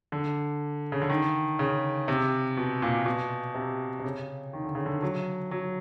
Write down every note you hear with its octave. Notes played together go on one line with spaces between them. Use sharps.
D3
C#3
D3
D#3
C#3
C3
B2
A#2
B2
C3
C3
C#3
D#3
D3
C#3
D3
F#3
F#3